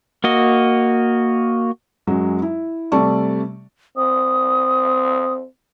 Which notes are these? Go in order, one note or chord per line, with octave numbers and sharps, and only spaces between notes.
A#3 F#4 D#5
F#2 F#3 G#3
E4
C3 G3 A3 D5 A5 C#6
C4 D#6